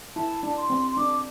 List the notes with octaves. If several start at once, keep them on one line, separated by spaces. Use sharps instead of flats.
E4 A5
D4 A5
C6
C4
C6
D4 D6